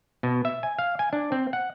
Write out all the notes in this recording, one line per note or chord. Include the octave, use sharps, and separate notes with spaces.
B2
E5
G#5
F5
G#5
D4
C4
F#5